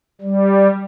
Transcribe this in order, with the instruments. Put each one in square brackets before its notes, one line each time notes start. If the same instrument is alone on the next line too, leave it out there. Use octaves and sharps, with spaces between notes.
[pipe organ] G3